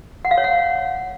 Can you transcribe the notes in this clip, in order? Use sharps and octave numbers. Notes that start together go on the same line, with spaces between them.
F#5
F5
C#5
F#5